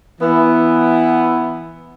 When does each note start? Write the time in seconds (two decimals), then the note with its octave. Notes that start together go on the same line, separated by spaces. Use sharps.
0.21 E3 B3 E4